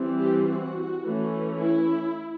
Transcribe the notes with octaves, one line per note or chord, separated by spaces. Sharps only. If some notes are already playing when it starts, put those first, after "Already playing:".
Already playing: E3 G3 C4
G4
F#4
E3 A3 C#4
E4